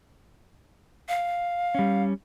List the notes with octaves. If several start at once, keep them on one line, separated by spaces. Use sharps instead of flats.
F5
G3 C#4